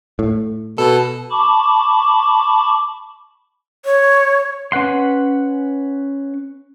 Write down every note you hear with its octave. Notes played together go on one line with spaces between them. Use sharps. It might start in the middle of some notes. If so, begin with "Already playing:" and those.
A2
B2 A4
A5 B5 C#6 D6
C#5
C#4 B4 F#5 C6